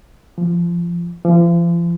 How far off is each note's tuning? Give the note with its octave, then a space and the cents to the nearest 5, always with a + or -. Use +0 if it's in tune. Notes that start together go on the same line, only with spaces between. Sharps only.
F3 -20
F3 -40